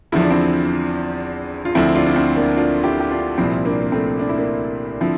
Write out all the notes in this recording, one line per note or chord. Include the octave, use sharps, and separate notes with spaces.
E2 D3 F3 E4
D4
C4 E4
F4
D2 D3 F3 C4 E4
D4 F4
D4
C4 E4
A#3 D4
D4 F4
E4 G4
G4
D4 F4
C2 A#2 F3 C4 E4
A#3 D4
A#3
A3 C4
D4
E4
A#3 D4
D3 F3 C4 E4